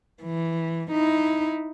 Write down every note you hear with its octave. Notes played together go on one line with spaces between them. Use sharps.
E3
D#4 E4